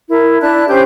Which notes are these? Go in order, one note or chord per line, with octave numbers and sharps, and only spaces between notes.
E4 A#4
D4 E4 A5 F#6
C#4 G4 C5 G6